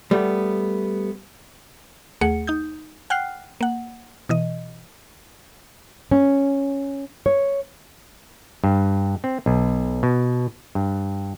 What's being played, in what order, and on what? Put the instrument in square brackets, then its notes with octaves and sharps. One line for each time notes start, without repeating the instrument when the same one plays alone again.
[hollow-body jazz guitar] G3 A3 B3
[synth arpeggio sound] D#2 A3 G#4 F#5 C#7
D#4 D#6 G6
F#5 G5 F6 F#6 C7
A#3 F#5
B2 E3 D#5
[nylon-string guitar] C#4
C#5
[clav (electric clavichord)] G2
C4
B1
B2
G2